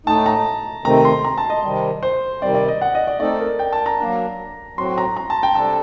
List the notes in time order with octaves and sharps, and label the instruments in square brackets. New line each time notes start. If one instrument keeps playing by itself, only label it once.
[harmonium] A2 A3 D#4 [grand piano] A5
[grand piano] A#5
[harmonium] C3 D#3 A3 C4 [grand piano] A#5
[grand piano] C6
A#5
A5
D#5
[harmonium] C3 D#3 G3
[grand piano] C5
[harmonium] C3 D#3 G3 C4 [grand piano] D5
[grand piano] D5
D#5
F#5
D#5
D5
[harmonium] A3 C4 D#4 A4 [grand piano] D5
[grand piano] A#4
G5
A5
A#5
[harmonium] F#3 A#3 D4
[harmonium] A2 F#3 C4 F#4 [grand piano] C6
[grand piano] A#5
A#5
A5
G5
[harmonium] C3 G3 D4 A4 [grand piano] A5